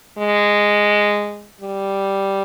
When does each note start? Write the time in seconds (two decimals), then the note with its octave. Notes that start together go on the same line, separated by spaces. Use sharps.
0.18 G#3
1.61 G3